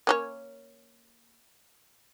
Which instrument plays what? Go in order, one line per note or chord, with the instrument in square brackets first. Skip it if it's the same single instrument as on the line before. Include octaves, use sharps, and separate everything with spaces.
[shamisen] A#3 C#4 C#5